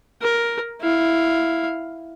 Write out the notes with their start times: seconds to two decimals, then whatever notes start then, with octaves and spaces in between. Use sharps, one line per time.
0.22 A#4
0.81 E4 F5